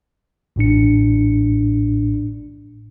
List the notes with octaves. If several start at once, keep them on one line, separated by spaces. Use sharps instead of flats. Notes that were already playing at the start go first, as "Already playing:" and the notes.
A1 A2 D4 C#7